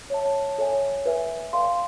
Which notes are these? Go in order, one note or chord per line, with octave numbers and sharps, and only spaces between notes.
C#5 E5 A5
A4 C#5 E5 G#5
B4 E5 G#5
A4 D5 F5 G#5 C6